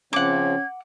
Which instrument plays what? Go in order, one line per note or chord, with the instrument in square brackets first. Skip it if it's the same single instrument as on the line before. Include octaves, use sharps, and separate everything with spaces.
[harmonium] C#3 F3 C4 [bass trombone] C#4 [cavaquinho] F#5 D6 [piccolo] G#6